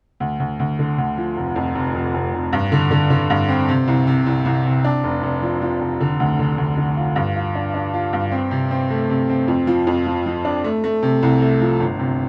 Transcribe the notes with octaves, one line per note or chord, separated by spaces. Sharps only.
D2
D2
D2
D3
D2
F3
F1
F2
F1
F1
F1
F1
G2
D3
D3
D3
G2
C4
C3
C2
C3
C2
C2
C3
D4
F1
F1
F3
F3
F1
D3
D2
D3
D2
D3
F4
G2
F4
D4
D4
F4
G2
C4
C3
C4
A3
C3
C4
F2
F3
F2
F3
F3
D4
A3
A3
C3
C2
A3
F3
G1
C3